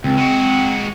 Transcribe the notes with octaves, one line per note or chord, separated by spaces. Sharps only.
C#2 C4
G#3 F#4